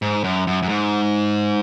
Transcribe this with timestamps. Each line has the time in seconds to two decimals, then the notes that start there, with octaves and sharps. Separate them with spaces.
0.02 G#2
0.24 F#2
0.47 F#2
0.63 F#2
0.69 G#2